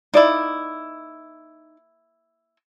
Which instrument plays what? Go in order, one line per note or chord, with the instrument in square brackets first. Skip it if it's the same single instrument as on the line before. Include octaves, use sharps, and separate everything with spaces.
[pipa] A#3 E4 [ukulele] D#4 D5